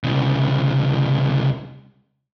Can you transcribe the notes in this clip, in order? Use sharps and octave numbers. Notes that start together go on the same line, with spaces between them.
C2 C#3